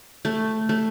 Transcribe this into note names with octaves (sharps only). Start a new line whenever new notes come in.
A3
A3